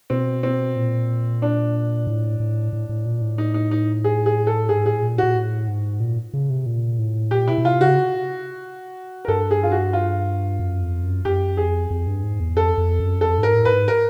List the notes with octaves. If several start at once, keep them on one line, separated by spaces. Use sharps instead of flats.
B2 C4
C4
A#2
D4
A2
A2
A2
A2
A#2
A2
D#4
D#4
D#4
G#4
G#4
A4
G#2 G#4
A2 G#4
A#2
A#2 F#4
A2
G#2
A#2
C#3
C3
A#2
A2
A#2 G4
B2 E4
B2
C3 F4
C#3 F#4
A#4
G2 A4
G#4
F4
F#4
F4
F#2
F2
F#2
F#2 G4
F2 G#4
F2
G2
G#2
E2
F2 A4
F2
F#2
F2 A4
G#2 A#4
A2
B4
G#2
A#4